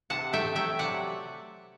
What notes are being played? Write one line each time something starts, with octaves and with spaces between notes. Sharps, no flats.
C3 F#5 A5
A3 E5 G5
F#3 E5 G5
C3 D5 F#5